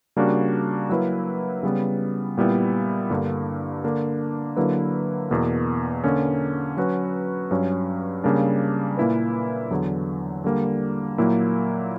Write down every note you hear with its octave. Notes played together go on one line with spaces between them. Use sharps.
C#3 G3 A#3 D4 F#4
F#3 A#3 E4 B4
C#3 G3 B3
A#2 G3 B3 E4
G2 D3 A#3
D3 A#3 D4
D3 F#3 A#3 E4 B4
E2 B2 A#3
D3 A#3 C#4
F#3 C#4 F#4 B4
G2 F#3 C#4
C#3 G3 A#3 D4
A#2 A#3 E4 B4
E2 D3 F#3
D3 G3 A#3
A#2 F#3 A#3 E4